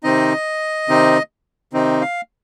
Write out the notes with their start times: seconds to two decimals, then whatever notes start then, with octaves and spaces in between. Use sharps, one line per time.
0.04 C3 D#3 C4 D#4 D#5
0.88 C3 D#3 C4 D#4
1.73 C3 D#3 C4 D#4
2.01 F5